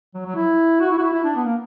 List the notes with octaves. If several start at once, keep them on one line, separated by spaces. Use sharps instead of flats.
F#3
F#3
E4
F#4
E4
F#4
E4
E4
D4
B3
A#3